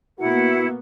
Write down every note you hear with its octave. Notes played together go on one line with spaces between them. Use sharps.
B2 A#3 B3 E4 F#4 F#5